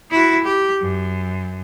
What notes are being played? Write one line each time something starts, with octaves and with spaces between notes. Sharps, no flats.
E4 F#4
G4
F#2